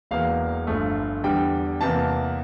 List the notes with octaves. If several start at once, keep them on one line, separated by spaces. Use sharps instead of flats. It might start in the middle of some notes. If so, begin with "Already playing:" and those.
E1 E2 E3 A#3 F5
G1 G2 F3 A3
E2 D3 G3 G5
E2 C3 E3 A#3 A5